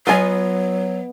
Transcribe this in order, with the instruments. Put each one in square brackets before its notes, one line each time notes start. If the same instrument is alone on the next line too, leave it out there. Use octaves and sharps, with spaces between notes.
[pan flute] F#3 [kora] B3 D#5 [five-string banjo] F4 G#5